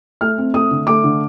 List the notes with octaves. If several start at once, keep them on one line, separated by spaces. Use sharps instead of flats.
A3 F6
C4
A3 D#6
D3
A3 D6
D3